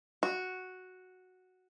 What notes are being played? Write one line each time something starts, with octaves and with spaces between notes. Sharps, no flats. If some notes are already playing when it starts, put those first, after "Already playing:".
F#4